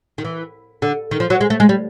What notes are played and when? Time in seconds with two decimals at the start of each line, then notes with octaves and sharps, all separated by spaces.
0.18 D#3
0.25 E3
0.82 D3
1.11 D#3
1.20 F3
1.30 F#3
1.41 G#3
1.50 A3
1.60 G#3
1.69 G3